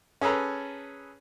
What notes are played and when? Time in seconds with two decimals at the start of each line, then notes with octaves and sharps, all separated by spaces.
0.21 C#4 G#4 A4 B4 A#5